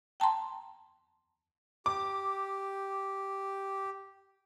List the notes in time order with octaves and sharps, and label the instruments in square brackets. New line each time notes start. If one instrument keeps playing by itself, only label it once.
[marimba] G5 A5 A#5 C6
[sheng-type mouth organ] G4 [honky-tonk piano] D6